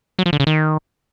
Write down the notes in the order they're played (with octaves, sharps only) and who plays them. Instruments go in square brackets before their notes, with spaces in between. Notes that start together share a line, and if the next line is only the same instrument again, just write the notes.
[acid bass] F#3
F3
D3
C#3
D#3